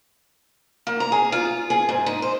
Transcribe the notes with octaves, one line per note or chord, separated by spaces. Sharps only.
A#3
A#5
G#4
F4
G#4
G#2
D#4
C5